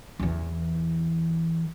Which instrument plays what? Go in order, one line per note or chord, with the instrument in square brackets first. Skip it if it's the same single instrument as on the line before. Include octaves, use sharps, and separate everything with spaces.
[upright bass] E2 E3